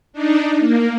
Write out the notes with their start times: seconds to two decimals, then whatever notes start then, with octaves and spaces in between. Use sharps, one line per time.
0.13 D4 D#4
0.59 A#3